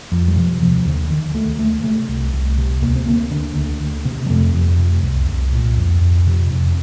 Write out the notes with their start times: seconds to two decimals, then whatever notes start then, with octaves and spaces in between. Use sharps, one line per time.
0.12 F2 F3
0.28 G3
0.36 C3 F3
0.61 D#2 F3
0.85 D#2 D3
1.10 D3 D#3
1.34 D2 A3
1.59 D2 A3
1.84 C3 A3
2.08 C2
2.33 C2
2.58 C3
2.82 D2 A#3
2.95 C4
3.07 D2 A#3
3.31 D3
3.55 D2
3.80 D2
4.05 C3
4.26 G3
4.30 F2 A3
4.54 F2
4.79 C3
5.03 C2
5.28 C2
5.52 A#2
5.77 F2
6.01 F2
6.26 C3
6.51 F2